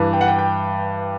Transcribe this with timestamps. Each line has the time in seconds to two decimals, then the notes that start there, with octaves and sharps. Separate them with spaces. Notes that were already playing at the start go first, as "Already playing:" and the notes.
Already playing: G2 E3
0.13 G5
0.21 F#5
0.28 G5
0.39 G5